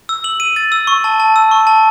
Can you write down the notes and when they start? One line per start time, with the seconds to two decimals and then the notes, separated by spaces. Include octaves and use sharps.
0.09 E6
0.24 F#7
0.40 D#7
0.56 A6
0.72 E6
0.87 C#6
1.04 A5
1.20 A5
1.36 E6
1.51 C#6
1.67 A5